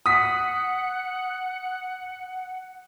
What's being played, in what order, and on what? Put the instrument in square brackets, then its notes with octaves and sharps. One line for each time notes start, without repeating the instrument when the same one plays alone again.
[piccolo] F#5 [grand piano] D#6 B6